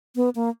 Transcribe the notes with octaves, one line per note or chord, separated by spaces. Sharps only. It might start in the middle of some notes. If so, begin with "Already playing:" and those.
B3
A#3